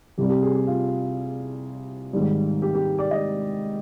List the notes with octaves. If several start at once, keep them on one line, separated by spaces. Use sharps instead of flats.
C2 C3 G3 G4
G4
G#4
G4
F4
G#2 D#3 G3
G4
G4
D5
D#5